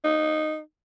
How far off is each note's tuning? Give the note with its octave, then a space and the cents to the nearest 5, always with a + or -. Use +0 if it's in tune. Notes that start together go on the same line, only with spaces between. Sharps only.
D#4 -10